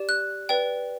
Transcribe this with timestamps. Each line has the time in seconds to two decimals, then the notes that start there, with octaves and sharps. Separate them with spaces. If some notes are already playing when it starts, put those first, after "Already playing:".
Already playing: G4 D5
0.09 F#6
0.49 B4 D5 G5